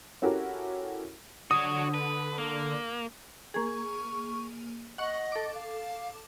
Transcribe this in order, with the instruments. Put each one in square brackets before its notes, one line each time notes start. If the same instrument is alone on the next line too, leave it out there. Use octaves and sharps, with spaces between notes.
[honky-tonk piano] C#4 E4 F#4 G4 A4 A#4
[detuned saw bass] D3 [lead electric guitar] F#4 C#5 [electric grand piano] D#6
[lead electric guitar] B4
A#3
[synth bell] A#3 G#4 [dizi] C#6
[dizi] D#5 [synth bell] F#5 C#6
[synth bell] A4 D6
[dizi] F5